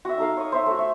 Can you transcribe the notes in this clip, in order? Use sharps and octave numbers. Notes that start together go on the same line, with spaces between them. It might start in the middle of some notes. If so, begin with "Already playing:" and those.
F#4 E5
D#4 A4 F5
C#5 D#6
C5 C#5 E5
A3 F#4
E5